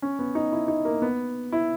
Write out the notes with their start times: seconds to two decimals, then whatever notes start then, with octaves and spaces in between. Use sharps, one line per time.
0.02 C#4
0.19 B3
0.35 D#4
0.52 E4
0.68 D#4
0.85 A#3
1.02 B3
1.52 E4